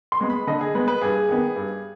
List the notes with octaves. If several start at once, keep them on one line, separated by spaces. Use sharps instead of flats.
C6
G#3 B3
B5
D3 D#5
G#4
G#3 B3 B4
B4
G2 G#4
D#3 B3
G2